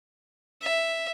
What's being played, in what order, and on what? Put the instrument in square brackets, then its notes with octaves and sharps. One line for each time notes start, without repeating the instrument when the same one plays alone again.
[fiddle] E5